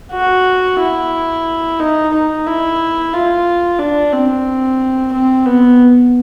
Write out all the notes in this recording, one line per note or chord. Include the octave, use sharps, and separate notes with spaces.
F#4
E4
D#4
D#4
E4
F4
D4
C4
C4
B3